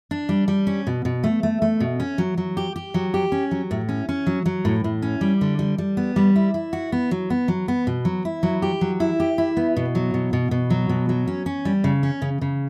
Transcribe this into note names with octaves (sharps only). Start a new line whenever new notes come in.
D4
G3
G3
C#4
B2
B2
A3
A3
A3
B2
C#4
F#3
F#3
G4
G4
F#3
G4
C#4
F#3
A2
C#4
C#4
F#3
F#3
A2
A2
C#4
G3
D3
G3
G3
B3
G3
E4
E4
F#4
B3
F#3
B3
F#3
B3
B2
F#3
E4
F#3
G4
F#3
E4
G4
E4
B3
B2
F#3
B2
B2
B2
F#3
B2
F#3
C#4
C#4
G3
C#3
C#4
C#3
C#3